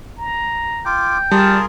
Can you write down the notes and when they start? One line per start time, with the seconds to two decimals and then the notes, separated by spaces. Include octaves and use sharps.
0.18 A#5
0.86 F4 G5 D6
1.31 G3 F4 G#4 A#4 A5